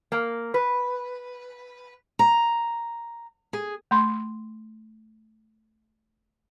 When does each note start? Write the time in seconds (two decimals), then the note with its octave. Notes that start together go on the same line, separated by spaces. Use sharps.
0.12 A#3
0.54 B4
2.19 A#5
3.53 G#4
3.91 A3 B5 C6